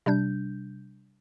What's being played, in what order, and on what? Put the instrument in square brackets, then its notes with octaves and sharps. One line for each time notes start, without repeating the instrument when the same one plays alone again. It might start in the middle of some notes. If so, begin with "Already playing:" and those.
[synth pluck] C3 G3 D4 G6